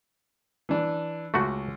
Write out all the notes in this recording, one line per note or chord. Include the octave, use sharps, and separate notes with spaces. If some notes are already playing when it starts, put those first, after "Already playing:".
E3 D4
C#2 A3 F#4